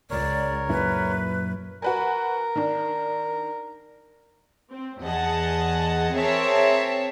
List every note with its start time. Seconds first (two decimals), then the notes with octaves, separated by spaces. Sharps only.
0.10 C#2 A#4 C#5 D5
0.69 F#2 A#2 E4 B4
1.82 F#4 A#4 B4 G#5
2.56 D#3 D4
4.72 C4
5.02 E2 G#4 D#5 F#5 A5
6.15 C4 G#4 A#4 C#5 E5 A5